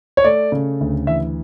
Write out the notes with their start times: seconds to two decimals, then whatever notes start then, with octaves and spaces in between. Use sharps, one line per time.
0.17 C#5
0.24 A3 D5
0.52 C#3
0.80 D2
1.07 E3 E5